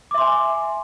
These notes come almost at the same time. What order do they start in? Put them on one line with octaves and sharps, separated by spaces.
D6 E5 C6 G#5